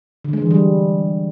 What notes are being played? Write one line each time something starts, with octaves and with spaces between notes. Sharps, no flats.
D3
G#3
E3
G3